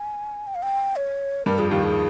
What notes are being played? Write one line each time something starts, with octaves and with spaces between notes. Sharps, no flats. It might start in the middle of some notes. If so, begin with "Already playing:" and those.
Already playing: G#5
G5
F5
G5
C#5
G2 G3 A#4
F2 F3 G#4
D#2 D#3 G4
G#4